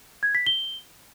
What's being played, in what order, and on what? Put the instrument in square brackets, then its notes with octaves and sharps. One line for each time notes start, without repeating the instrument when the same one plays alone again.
[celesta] G#6
B6
G7